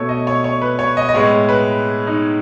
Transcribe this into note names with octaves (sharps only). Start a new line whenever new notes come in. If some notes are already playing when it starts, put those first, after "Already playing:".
Already playing: B2 A3 A4 C#5
D#5
C#5
C#5
B4
C#5
D#5
D#5
A2 G#3 B3 C#5
B4
D#4